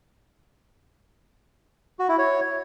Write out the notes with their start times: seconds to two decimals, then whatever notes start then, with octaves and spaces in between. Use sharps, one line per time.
1.99 F#4
2.09 E4
2.18 C#5